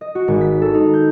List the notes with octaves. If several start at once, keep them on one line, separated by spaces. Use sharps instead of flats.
D#5
F#4
G#1
B6
A4
D#4
G6